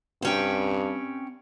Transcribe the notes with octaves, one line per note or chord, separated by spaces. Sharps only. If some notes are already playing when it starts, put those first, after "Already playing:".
G2 C4 C#4 G5